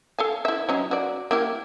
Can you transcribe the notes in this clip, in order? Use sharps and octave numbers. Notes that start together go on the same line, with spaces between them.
A4 F5 G#5
E4 E5
F#3 C#4 D#4
F#4 D5
A#3 E4 G4